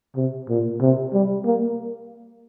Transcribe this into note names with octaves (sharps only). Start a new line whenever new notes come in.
C3
A#2
C3
G3
A#3